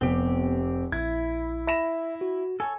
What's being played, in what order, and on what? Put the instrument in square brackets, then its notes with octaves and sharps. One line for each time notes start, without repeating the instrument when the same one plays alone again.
[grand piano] F1 [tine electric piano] B3 [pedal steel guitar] C4 G4
[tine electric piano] A#1 [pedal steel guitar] E4 [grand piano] G#6
[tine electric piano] E5 [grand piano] B5 A#6 E7
[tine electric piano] F#4
[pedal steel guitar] A4 C#5 [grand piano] G#5